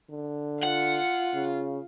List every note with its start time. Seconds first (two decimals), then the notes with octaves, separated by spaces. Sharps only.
0.10 D3
0.63 F4 F#5
1.34 C#3